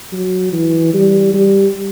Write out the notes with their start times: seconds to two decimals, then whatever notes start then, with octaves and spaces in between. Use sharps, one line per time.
0.12 F#3
0.52 E3
0.94 G3
1.34 G3